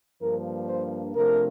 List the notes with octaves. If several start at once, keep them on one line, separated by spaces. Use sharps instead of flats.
G2 F3 A#3 D4 A#4
C5
C3 F3 A3 D4 A#4